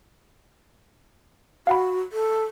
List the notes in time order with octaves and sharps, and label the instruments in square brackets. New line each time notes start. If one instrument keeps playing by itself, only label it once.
[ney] F#4 [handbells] F5 F#5 B5
[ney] A4